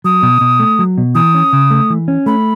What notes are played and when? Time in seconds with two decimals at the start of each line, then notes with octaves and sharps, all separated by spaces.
0.04 F#3 D#6
0.23 B2
0.41 B2
0.60 A3
0.79 F#3
0.98 B2
1.15 E3 D#6
1.35 C#4
1.53 C#3
1.71 A3
1.90 E3
2.08 C#4
2.26 A3 B5